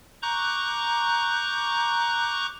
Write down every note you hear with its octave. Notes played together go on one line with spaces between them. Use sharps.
A#5 C#6 D6 F#6 G6